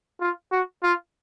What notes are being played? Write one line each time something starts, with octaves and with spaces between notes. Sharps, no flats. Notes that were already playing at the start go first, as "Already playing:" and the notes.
F4
F#4
F4